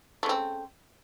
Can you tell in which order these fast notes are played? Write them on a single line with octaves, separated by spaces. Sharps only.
A3 C#3 C4